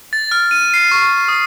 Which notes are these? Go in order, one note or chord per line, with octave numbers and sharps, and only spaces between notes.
A6
F6
D#7
C7
C#6
D#6